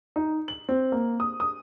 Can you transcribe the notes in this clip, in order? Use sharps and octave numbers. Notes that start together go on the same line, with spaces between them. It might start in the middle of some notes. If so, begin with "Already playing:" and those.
D#4
F#7
C4
A#3
D#6
D#6